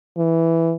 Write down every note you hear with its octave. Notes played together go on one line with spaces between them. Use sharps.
E3